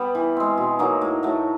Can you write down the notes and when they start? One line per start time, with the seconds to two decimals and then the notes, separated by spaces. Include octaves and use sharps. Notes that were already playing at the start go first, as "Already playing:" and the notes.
Already playing: G3 B3
0.15 E3
0.37 G#3 C4
0.57 B2
0.79 F#3 A#3 D#4
1.01 A2
1.23 F#3 A3